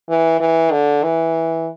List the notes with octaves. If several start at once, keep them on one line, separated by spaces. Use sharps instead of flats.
E3
E3
D3
E3